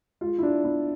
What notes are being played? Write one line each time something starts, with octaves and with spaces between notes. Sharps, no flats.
G#3 F4
E4
D4
B3 E4